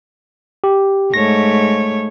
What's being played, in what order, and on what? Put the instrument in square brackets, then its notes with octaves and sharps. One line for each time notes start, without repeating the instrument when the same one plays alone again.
[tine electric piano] G4
[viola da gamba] G#2 A3 C#5 [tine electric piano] A#6